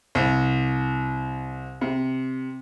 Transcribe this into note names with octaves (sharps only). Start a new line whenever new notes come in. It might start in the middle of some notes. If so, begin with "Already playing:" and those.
C2
C3